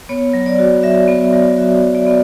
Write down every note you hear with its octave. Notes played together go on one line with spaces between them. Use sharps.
B3 C#5
F#3
D5
F#4
F#3 E5
B3
D5
F#3
F#4 E5
F#3
D5
B3